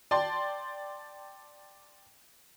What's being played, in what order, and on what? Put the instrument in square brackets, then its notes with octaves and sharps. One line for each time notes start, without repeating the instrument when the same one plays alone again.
[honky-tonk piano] D5 G5 A5 C6